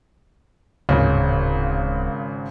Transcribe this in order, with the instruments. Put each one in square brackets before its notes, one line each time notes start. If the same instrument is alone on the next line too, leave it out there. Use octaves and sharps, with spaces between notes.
[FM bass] D1 [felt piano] G#1 C#3